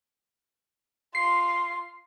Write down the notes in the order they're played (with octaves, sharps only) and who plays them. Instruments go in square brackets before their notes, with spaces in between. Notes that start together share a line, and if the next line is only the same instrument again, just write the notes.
[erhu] F4 [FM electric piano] C7